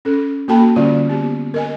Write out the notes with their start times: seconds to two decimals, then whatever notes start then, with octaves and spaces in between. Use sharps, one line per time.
0.05 C#4 A4
0.48 A#3 F#4 A4 G5 A5 B5
0.76 D3 G3 C#4 F4 D5
1.09 B3 G4
1.54 A#4 D#5 G#5